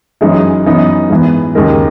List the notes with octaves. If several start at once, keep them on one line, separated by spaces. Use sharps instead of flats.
F#2 E3 G#3 D#4
F#2 E3 B3 D#4
G#2 E3 B3
D#2 C#3 G#3 D#4 A#4